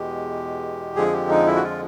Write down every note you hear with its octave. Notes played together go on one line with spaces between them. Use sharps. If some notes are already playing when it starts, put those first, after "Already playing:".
Already playing: E2 B2 G#3 G4
F2 D3 F3 G#3 G#4
G4
D#4
E4
F#4
F4